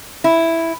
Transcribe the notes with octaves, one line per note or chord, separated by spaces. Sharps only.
E4